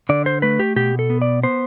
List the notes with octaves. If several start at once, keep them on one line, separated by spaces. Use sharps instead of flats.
D3 D5
C5
A3 B4
G4
B2 G4
A4
B3
D5
B3 C5